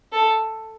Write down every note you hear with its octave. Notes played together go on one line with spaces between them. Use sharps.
A4